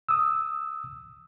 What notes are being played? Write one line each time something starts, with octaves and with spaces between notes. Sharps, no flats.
D#6 E6